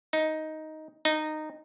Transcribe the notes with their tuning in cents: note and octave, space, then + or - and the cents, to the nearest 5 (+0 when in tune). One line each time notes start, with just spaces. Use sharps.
D#4 +5
D#4 -15